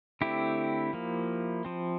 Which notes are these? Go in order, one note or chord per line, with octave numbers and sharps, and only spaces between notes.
D3 A3 C4 E4 G4
F3 A#3
F3 C4